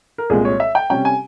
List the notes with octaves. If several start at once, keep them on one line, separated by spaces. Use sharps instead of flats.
A#4
C2 A#2 G#3 G#4
C#5
E5
G5
C3 G3 C#4 G5
G#5